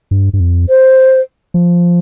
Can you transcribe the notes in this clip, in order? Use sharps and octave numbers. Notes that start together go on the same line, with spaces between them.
G2
G2
F2
C5
F3